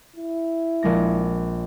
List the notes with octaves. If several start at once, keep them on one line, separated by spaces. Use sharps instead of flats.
E4
A#1 G#3 A#6